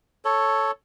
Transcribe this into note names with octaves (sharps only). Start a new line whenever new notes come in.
A4 C#5